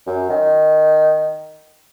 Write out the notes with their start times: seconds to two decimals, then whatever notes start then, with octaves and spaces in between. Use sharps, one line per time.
0.07 F#2
0.30 D#3